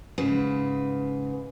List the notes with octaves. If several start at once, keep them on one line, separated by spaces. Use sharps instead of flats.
G#2 C#3 B4